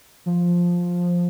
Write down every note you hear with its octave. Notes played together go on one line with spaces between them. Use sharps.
F3